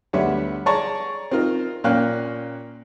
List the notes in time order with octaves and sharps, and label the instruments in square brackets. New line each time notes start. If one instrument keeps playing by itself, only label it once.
[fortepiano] D2 G3 B3 C#5 E5 F#5
G#4 C#5 D5 A5 A#5 C#6
C4 D#4 F4 A#4
A#2 A#3 C#4 F5 G5 F#6